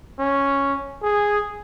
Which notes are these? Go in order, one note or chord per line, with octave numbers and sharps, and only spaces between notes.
C#4
G#4